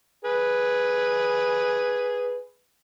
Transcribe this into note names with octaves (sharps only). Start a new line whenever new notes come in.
G#4 B4